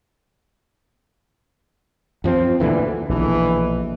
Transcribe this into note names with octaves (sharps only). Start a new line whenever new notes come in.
F#2 F3 C4
D2 A#2 D3 E3
A#1 E2 B2 D3 E3